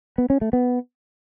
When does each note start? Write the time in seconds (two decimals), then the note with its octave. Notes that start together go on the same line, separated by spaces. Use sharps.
0.18 B3
0.30 C#4
0.41 A3
0.53 B3